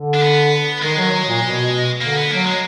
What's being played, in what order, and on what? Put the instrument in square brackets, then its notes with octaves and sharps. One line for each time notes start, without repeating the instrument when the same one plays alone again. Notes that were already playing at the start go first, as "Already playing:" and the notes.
Already playing: [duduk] D3
[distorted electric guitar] D4
B3
[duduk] D#3 [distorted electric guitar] G#3
[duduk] F#3
F#3
A#2
B2
[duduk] D3 [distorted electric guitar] A#3
[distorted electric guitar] B3
[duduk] F#3 [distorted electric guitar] A#3
[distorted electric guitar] G#3